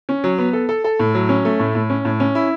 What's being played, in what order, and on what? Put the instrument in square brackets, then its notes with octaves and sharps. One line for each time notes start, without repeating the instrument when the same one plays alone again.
[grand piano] C#4
F#3
B3
A4
A4
A4
A2
F#3
C#4
A3
A2
A2
C#4
A2
C#4
E4